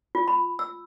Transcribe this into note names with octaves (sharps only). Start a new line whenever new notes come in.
F4
B5
E6